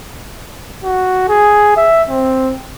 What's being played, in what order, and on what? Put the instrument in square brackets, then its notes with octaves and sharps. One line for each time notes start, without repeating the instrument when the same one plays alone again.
[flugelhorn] F#4
G#4
E5
C4